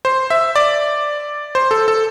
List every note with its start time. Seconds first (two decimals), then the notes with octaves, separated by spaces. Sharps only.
0.05 C5
0.30 E5
0.56 D5
1.55 C5
1.71 A4
1.88 A4